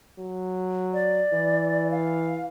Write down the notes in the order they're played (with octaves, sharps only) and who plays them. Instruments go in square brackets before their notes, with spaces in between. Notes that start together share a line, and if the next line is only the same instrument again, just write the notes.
[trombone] F#3
[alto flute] D5
[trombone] E3
[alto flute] F5